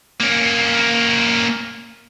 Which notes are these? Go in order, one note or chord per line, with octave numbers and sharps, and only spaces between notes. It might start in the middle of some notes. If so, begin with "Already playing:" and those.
A#3 C#4